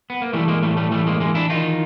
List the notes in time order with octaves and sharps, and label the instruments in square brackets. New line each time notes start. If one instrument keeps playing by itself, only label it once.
[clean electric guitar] B3
A#3
E3 G3 A3
G#3 A#3
A2 G3 A3
G3 A3
E3 G3 A3
G#3 A#3
E3 G#3 A#3
D4 E4
D#3 D#4 F4